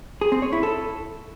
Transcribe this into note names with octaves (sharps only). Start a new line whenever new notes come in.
G#4
C4
C#5
E4
A4